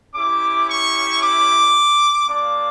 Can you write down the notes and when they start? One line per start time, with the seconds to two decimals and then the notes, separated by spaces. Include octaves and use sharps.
0.13 C#4 E4 G4 D6
0.67 C#6
1.20 D6
2.28 A#3 D4 F4 D6